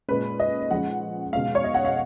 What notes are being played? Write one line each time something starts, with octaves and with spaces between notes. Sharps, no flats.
A#2 G#3 C#4 B4
D#5
F3 G#3 C#4 F#5
B2 G#3 C#4 F5
C#5
D#5
F#5
F5